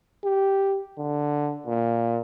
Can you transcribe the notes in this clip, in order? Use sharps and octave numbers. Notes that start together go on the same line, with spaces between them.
G4
D3
A#2